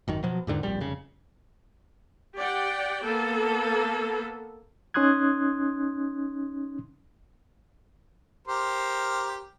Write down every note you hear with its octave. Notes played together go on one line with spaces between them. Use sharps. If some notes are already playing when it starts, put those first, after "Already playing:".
G#1 F#2 D#3
B2 F3 F#3
E2 G#2 D3 D#3
D1 A#1 G3
F1 C#3
G4 D5 F#5 G5
A#3 B3 A4
C#4 D#4 C6 D#6 F#6 G#6
G4 A#4 C5